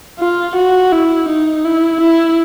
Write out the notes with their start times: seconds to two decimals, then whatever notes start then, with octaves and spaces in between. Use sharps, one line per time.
0.20 F4
0.56 F#4
0.92 E4
1.29 D#4
1.65 E4
2.01 E4